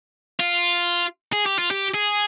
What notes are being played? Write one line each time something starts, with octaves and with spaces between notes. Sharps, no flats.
F4
G#4
G4
F4
G4
G#4